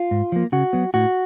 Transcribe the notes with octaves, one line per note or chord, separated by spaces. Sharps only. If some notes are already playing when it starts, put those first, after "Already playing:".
Already playing: F4
G#2
F3 A#3
C#3 F#4
F#3 B3
A2 F#4